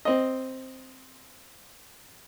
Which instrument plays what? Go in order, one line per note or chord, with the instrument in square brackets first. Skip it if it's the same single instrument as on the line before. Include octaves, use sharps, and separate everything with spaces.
[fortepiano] C4 D#5